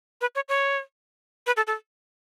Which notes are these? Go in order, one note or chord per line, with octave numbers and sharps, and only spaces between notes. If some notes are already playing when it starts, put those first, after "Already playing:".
B4
C#5
C#5
B4
A4
A4